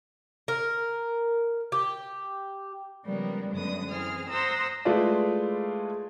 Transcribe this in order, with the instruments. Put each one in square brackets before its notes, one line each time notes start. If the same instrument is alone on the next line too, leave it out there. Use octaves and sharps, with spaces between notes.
[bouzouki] A#4
G4
[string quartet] C#3 F3 G3 G#3 A#3 B3
F#2 D3 G#3 B3 D#6
E3 C4 G#4 F6
C5 F#5 A#5 C6 D#6 E6
[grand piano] G#3 A3 E4 F4 B4 D5